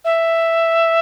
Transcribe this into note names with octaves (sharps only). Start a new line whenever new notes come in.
E5